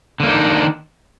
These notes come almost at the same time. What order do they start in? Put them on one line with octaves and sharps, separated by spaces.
D3 A#3 D#4 D4 D#3